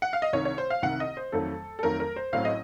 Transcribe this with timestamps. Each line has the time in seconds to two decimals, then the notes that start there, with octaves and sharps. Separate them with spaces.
0.02 F#5
0.13 F5
0.22 D#5
0.33 C2 C3 D#3 C#5
0.45 C#5
0.58 C5
0.70 F5
0.82 C2 C3 D#3 F#5
1.00 D#5
1.17 C5
1.32 F2 D#3 F#3 A3 A4
1.79 A4
1.83 F2 D#3 F#3 A3 A#4
2.00 A#4
2.16 C5
2.32 A1 A2 F#3 C4 F5
2.45 D#5